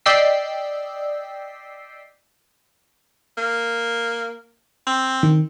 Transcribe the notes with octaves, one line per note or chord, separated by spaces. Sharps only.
D5 D#5 G5 E6 B6 C7
A#3
C4
D#3